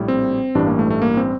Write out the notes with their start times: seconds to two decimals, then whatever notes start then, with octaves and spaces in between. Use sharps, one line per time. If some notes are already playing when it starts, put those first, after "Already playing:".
Already playing: A#1 A2 G3
0.08 C4
0.55 A1 G2 E3 G3 D4
0.67 A#3
0.79 A3
0.90 A3
1.02 A#3
1.17 C4